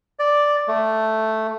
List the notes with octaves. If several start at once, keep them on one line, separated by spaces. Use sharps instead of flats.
D5
A3